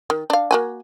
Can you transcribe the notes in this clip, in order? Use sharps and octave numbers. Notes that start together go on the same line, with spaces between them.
D#3
D4 F5
A#3 F#4 G#5